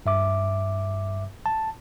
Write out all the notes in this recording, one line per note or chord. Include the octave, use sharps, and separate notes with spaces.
G2 E5 D6
A5